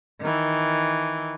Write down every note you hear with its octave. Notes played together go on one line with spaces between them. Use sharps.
D#3 E3